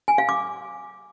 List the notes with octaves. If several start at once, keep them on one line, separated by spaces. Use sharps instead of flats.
G#5
F5
D6